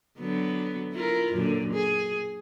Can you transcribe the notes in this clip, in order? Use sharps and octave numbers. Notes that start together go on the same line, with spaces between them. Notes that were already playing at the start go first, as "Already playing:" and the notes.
D3 F#3 B3
E4 F4 A#4
F#2 A#2 D3
G#4